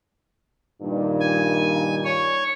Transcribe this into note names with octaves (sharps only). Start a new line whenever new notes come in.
G2 A#2 D#3
G#5
C#5